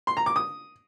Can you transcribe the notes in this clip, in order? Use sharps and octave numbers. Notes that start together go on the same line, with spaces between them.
C6
A#5
D6
D#6